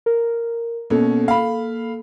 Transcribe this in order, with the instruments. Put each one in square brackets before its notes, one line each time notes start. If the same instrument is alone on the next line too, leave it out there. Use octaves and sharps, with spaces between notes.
[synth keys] A#4
[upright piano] B2 C#4 [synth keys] A#3 A4
[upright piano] F5 B5